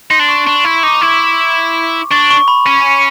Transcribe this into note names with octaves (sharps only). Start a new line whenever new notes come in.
D#4 C6
D4
C#6
D4 C#6
E4 C#6
D#4 D6
D6
E4 C#6
D4 C#6
C#6
B5
C#4